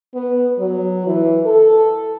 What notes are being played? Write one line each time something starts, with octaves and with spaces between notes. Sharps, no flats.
B3
F#3
E3
A4